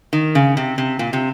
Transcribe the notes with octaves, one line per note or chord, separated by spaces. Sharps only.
D#3
C#3
C3
C3
A#2
C3